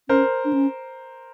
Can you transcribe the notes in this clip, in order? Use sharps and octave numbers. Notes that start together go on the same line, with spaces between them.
C#4 A#4 C5
D4
C#4